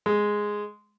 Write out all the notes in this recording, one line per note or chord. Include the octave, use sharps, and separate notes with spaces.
G#3